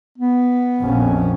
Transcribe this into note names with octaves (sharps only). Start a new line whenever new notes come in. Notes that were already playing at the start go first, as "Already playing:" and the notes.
B3
A#1 F2 C#4